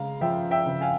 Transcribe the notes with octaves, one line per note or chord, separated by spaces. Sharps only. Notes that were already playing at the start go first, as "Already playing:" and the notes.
Already playing: C#3 G#3 F5 A#5
F3 E5 G5
E5 G5
C#3
F5 G#5